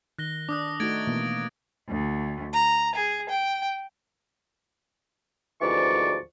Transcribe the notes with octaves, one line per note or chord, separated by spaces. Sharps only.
D#3 F#6 A#6 G7
D4 D6 D#6 F#6
A3 D#4 F#4 G#6 A6 D7
B2 E3 A#3
D2
A#5
G#4
G5
D2 G#2 E3 F3 D5 C#6